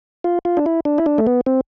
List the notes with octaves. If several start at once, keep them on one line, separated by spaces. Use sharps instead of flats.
F4
F4
D4
E4
D4
E4
D4
A3
B3
C4